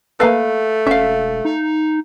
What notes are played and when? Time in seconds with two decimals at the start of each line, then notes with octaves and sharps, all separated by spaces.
0.20 A3 A#3 A4 B4 F5
0.87 E1 C#4 E5 F5
1.45 D#4